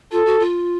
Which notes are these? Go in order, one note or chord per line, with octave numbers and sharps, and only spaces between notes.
F4 A4
F#4
F4